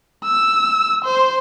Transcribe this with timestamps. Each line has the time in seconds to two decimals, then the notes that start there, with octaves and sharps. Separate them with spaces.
0.24 E6
1.05 C5